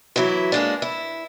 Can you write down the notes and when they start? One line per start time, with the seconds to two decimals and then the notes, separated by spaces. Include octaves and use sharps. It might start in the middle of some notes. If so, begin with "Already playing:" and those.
0.16 E3 F#3 E4
0.52 G#3 A#3 D4
0.82 E4